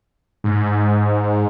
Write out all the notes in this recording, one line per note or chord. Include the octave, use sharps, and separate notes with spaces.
G#2